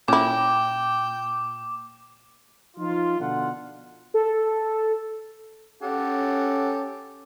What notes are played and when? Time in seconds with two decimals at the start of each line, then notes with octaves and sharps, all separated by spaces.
0.08 A#2 C#4 E4 G5 D6
2.77 F3 D#4 F4
3.20 B2 D3 F4 F#5
4.14 A4
5.83 C#4 G4 A4 F#5